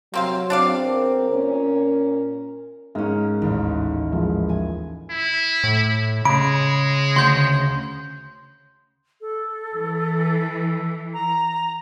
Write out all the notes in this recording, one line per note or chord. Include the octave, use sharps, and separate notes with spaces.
C3 F#3 A#3 C4 F5
E2 C4 D4 D5 F5
A#4
A#2 C#4
G#2 A#3 C#4
A1 D#2
G#2 E3 F3
G#5
E4
A2
C#3 G#3 B5 D7
D2 C6 G6
A4
E3
A#5